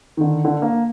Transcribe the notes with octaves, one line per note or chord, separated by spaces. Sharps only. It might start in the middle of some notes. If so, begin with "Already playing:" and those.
D3 D#3
D3
A#3